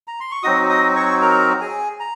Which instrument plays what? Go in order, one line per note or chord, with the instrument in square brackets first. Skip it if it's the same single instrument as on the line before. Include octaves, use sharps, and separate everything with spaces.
[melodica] A#5
C6
C#6
F#3 C4 D#4 F#4 D#5 D#6
D#5 D#6
C#5 C#6
A#4 A#5
G#4 G#5
A#5